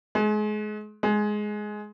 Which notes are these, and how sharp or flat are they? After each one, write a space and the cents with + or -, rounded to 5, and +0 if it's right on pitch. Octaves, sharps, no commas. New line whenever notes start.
G#3 +30
G#3 +10